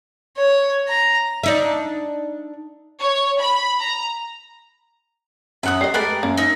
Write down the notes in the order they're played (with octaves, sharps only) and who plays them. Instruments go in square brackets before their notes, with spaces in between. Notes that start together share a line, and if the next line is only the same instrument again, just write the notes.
[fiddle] C#5
A#5
[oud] D4 D#4 E5
[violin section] C#5
B5
A#5
[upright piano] F#2 F#6 [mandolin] E5 F#5 D#6
[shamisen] G3 D#5 [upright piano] C7
[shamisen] G#3 A3 B4 [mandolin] G4 A#4 D5
[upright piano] F#2 [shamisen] A#3
[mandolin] D#4 A#4 E5